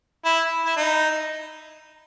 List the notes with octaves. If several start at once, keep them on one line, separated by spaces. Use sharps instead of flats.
E4
E4
D#4